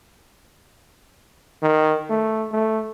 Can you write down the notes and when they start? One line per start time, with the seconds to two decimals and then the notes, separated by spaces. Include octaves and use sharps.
1.62 D#3
2.10 A3
2.51 A3